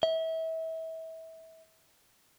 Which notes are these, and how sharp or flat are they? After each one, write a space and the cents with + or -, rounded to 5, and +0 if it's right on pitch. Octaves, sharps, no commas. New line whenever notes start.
E5 -30